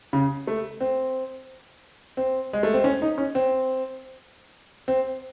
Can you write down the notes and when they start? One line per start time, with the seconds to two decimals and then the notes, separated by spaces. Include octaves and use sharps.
0.13 C#3
0.47 A3
0.81 C4
2.17 C4
2.53 G#3
2.63 A3
2.74 C4
2.84 C#4
3.02 D#4
3.18 C#4
3.35 C4
4.88 C4